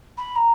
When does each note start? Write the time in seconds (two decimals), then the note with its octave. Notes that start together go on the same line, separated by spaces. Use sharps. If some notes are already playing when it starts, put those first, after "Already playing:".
0.18 B5
0.36 A#5